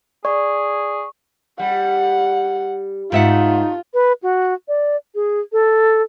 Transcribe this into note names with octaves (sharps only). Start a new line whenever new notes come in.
G#4 D5 C#6
G3 F#5
G#2 A3 D#4 F4 E5 F#5
B4
F#4
D5
G#4
A4